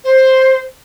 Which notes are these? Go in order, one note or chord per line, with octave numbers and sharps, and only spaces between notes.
C5